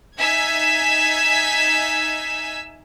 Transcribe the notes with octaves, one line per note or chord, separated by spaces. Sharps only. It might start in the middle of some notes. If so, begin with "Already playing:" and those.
D#4 E5 G#5 E6 G#6 B6